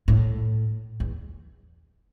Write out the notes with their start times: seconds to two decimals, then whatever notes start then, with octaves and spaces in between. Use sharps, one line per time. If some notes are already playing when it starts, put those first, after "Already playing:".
0.08 A2
1.00 E2